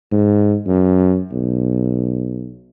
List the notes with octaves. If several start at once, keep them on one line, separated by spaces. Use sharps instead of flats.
G#2
F#2
B1